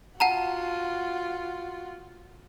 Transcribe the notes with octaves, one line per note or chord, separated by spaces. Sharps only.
F4 F#4 F#5 A5 A#5